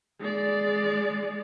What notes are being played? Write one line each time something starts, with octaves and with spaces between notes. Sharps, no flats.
G#3 D5